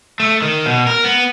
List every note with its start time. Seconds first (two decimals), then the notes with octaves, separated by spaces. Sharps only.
0.20 A3
0.42 D#3
0.66 B2
0.87 A#4
1.04 B3